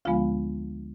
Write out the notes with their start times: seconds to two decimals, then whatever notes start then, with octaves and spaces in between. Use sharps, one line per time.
0.05 D2 D3 F3 G#3 B3 F4 F5